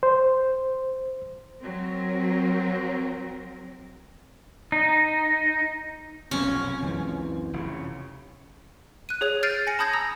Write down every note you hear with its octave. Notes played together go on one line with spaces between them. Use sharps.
C5
F#3 C4 A#4
D#4
F1 B1 A#2 C4 C#4
C#2 F#2 E3 C4
F1 C#3
F#6 D#7
G#4 C#5 F7
F6 G6 A6 C7 D7 D#7
G#5 A#6 C#7
A5 B5 D#6 G6 G#6 A#6
A#5 D#6 E6 A#6